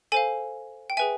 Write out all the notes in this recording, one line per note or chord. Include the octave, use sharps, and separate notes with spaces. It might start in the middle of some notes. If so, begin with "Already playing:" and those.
A4 C5 F5 G#5
G5
G#4 B4 E5 G#5